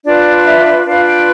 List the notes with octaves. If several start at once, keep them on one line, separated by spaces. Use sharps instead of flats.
D4 F4 B4 D5
E5
D4 F4 B4 F5
G5